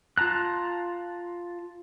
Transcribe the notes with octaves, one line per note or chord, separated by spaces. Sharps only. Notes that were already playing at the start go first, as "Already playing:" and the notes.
F4 A5 A#5 F#6